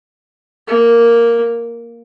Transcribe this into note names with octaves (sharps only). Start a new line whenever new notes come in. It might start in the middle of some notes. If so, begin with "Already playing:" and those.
A#3